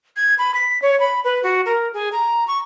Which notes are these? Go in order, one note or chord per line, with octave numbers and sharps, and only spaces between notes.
G#6
B5
B6
C#5
B5
B4
F#4
A#4
G#4
A#5
C#6